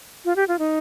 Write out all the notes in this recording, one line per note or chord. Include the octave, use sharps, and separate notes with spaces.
F4
G4
F4
D#4